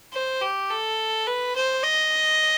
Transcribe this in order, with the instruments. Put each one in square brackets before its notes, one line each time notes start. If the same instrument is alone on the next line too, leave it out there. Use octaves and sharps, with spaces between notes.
[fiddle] C5
G4
A4
B4
C5
D#5